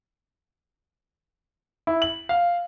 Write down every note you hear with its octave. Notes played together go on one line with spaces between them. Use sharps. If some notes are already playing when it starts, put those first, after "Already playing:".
E4
F#7
F5